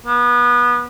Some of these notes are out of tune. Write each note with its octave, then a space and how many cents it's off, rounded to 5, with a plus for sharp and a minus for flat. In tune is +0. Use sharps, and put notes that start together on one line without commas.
B3 -25